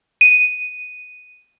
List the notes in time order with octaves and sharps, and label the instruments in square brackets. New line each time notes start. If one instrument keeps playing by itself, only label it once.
[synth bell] D#7